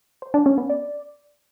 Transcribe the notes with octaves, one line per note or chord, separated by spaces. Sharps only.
C5
D4
C#4
B3
D5